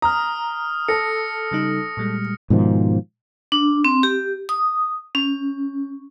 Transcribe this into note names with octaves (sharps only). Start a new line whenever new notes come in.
A#5 D#6 F6
A4 A#6 C#7
C#3 G3 D#4
A#2 G3 G#3
G#2 B2 D#3 F3
D4
C4
G4
D#6
C#4